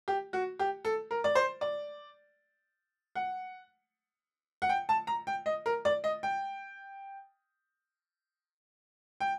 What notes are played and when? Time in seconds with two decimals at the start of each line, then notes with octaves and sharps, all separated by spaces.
0.08 G4
0.33 F#4
0.59 G4
0.85 A4
1.11 A#4
1.24 D5
1.35 C5
1.61 D5
3.15 F#5
4.62 F#5
4.69 G5
4.89 A5
5.07 A#5
5.27 G5
5.46 D#5
5.66 A#4
5.85 D5
6.04 D#5
6.23 G5
9.20 G5